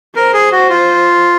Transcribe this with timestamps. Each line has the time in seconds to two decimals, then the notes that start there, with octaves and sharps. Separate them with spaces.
0.16 A#4 C5
0.34 G#4
0.52 F#4
0.70 F4